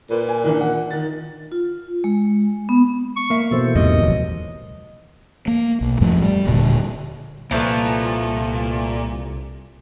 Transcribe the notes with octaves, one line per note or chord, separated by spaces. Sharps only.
A#2 B4
G#5
D#3 E3 D4
F#5
D#3 A6
F4
G#3
B3
C#6
A#3 E5
B2 E3 A4 C5
E2 G#2 C3 D#5
D1 A#1 F#3
A#3
B1
F2 A2 F3 A3
G3 A#3
D#1 A#2 D3
C2 A#2 E3 F3 A3